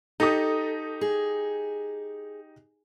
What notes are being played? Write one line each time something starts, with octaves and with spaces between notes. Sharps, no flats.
D#4 G4 A4 D#6
G#4